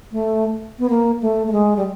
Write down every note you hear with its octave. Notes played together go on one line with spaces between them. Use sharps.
A3
B3
A#3
A3
A3
G#3
G3